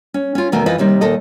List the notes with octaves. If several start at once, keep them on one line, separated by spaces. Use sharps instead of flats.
C#4
C#4 F4
E2 B2 D#3 A3 A#4 G#5
F2 E3 F4 B4 D#5
D#2 C3 G3 D#4
D#2 A#2 A4 D#5